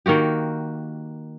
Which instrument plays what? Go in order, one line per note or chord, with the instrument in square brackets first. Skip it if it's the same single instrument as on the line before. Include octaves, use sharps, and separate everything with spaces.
[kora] D#3 A#3 F#4 G4